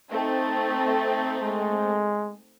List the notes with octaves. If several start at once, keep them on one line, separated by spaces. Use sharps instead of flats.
A3 C4 D#4
G#3